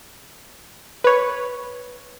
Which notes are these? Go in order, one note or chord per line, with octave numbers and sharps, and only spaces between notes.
B4 C#5